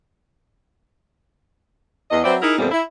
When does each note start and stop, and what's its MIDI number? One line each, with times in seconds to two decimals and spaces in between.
2.11 2.22 40
2.11 2.22 75
2.24 2.37 54
2.24 2.37 60
2.24 2.37 71
2.24 2.37 72
2.24 2.37 74
2.24 2.37 76
2.42 2.56 63
2.42 2.56 64
2.42 2.56 68
2.42 2.56 70
2.58 2.70 41
2.58 2.70 46
2.58 2.70 52
2.58 2.70 55
2.58 2.70 59
2.58 2.70 60
2.71 2.82 64